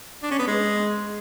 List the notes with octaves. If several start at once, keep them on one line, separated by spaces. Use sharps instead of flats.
D4
C#4
B3
G#3